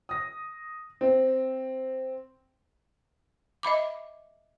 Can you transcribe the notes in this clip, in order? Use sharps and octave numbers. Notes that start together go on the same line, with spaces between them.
D#6 A#6
C4
D#5 E5 B5 D6